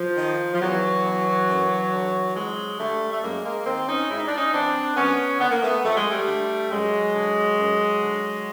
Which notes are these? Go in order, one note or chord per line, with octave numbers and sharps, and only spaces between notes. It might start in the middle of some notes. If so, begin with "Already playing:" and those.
Already playing: F3
D#3
F3
E2 E3 F#3
B2
F#2
D3
F2 F#3 G#3
D3 G3 A3
A3
F#2 G#3 A#3
G#3 A#3
D#3 A#3 C4
C#4 D#4
G#2 E4
D#4
D4
C#4 D#4
E3 C4 D4
F#2 B3 C#4
D3 B3
A#3
A3 B3
F2 A3
G#3
G3 A3
D3
F#2 F#3 G#3
D3
F#2
D3